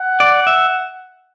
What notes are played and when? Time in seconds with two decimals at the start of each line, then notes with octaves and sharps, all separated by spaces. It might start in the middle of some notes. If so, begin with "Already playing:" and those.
Already playing: F#5
0.20 D5
0.47 E5